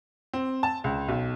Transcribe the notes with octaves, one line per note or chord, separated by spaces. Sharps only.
C4
A5
C#2
B1